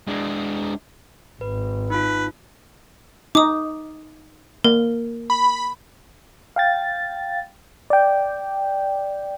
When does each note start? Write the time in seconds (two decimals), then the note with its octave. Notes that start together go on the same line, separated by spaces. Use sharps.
0.08 G#3 D4
1.41 G#1 B4
1.90 D#4 F4 B4
3.35 D#4 D6 D#6
4.64 A#3 A#4
5.30 B5
6.56 F5 G5 A6
7.90 D5 G5